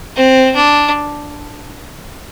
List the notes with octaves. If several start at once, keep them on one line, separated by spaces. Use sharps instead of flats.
C4
D4